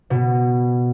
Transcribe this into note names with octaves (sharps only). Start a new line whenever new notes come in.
B2